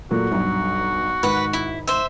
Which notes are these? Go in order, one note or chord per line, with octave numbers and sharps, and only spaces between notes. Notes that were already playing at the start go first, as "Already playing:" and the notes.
A#2 F#3 A3 F#4
B1 G2
G#2 D#3 B4 F#5
E4
C5 E5